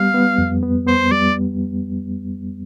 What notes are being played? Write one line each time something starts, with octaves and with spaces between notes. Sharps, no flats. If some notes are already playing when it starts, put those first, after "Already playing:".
Already playing: G3 B3 F5
B3
F2
B3
B3 C5
G3 D5